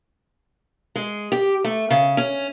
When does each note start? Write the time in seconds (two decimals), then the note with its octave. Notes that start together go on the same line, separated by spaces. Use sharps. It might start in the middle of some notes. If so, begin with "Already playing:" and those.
0.96 G#3
1.32 G4
1.64 A3
1.90 C#3
2.17 C#4